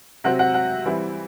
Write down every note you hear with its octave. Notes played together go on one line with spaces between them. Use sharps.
C3 F#3 C4 F#5
F#5
F#5
E3 G3 C4 E4